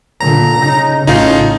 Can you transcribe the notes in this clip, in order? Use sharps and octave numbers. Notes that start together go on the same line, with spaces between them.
A#2 D3 A#5
C#3 D#4
A1 A2 C#3 D#4 F4